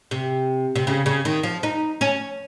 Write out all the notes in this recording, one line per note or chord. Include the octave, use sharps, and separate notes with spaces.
C3
C3
C#3
C#3
D#3
F3
D#4
C#4